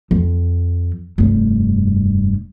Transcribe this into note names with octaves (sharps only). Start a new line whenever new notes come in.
F2
F1 G2